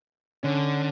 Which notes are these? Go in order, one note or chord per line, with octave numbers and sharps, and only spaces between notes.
D3 C#4